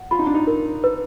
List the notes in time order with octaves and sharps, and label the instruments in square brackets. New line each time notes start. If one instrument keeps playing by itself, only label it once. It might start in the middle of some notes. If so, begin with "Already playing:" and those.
Already playing: [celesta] F#5
[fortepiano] F4 [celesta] B5
[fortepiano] D#4
D4
D#4
[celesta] A#4
B4